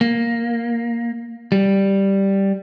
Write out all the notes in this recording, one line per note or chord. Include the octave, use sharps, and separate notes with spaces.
A#3
G3